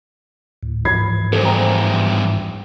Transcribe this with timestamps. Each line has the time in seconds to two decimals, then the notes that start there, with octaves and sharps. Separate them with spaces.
0.63 D2 A2
0.85 G#2 E3 F3 B5 G#6 C7
1.33 E2 G2 A4 C5
1.45 C5 G5 A#5